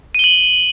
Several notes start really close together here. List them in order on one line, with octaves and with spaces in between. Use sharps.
D#7 G7 F#7